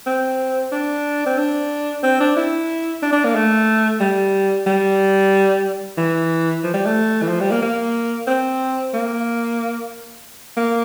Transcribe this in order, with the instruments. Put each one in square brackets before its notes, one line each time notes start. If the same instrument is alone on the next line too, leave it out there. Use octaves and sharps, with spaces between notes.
[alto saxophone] C4
D4
C4
D4
C4
D4
E4
D4
D4
A#3
A3
G3
G3
E3
F3
G3
A3
E3
F3
G3
A#3
A#3
C4
A#3
A#3